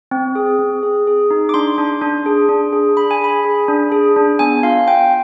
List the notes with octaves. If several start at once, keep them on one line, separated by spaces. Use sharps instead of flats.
C4
G#4
C4
G#4
G#4
D#4
D6
D4 C6
D4
D4
G#4
D4
G#4
D4 B5
G#5
G#4 B5
G#4
D4
G#4
D4
B3 G#5
F4 F5
F4 G5